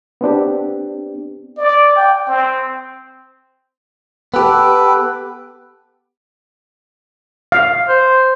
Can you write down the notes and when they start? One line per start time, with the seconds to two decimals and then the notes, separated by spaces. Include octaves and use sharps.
0.21 B3 C4 D4 G4
1.58 D5
1.96 G5
2.28 C4
4.34 B3 G4 A4 B4
7.52 F5
7.88 C5